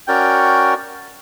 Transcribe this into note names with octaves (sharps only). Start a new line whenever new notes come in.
C#4 F#4 A#4 D5 G5